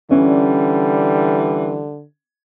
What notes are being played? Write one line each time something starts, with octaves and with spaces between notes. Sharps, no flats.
D3 E3 G3 C#4